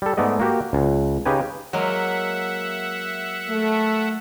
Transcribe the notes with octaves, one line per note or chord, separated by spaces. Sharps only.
G3 A4
G#2 A3 B3 D5 D#5
A#3 F#4 G4
C#2
C#3 D#4 G4 B4 G#5
F#3 G#3 A#3 E5 F#5
A3